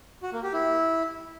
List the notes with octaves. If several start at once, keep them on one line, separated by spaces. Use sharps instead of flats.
F#4
A#3
G4
E4